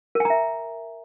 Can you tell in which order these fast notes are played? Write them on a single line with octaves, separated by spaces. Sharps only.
A#4 G#5 A#5 E5